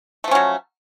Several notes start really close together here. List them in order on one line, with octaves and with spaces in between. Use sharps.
A3 F3 C#4 F#3